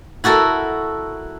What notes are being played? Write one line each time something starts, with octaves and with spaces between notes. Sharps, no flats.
E4 F#4 A4 A#4